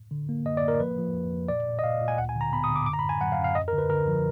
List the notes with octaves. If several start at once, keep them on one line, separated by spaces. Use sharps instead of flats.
D3
A#3
F#2 D#5
D5
A#3 A#4
D5
F3 B4
F3
F2
F2
A#2 D5
A#2
D#5
A#2 F5
A#2
G#5
D2 F#5
G#5
D3
A#5
B3 B5
D#6
D3
D6
F#2 D6
A#5
B5
F#2 G#5
F#3 F#5
F5
F#2
F5
D#2 D#5
A#4
D3
B4
D3 A#4
F3